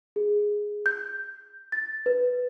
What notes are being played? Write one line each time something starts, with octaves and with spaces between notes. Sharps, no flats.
G#4
G6
A6
B4